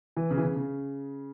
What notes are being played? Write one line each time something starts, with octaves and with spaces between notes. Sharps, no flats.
E3
C#3
E3
C#3
C#3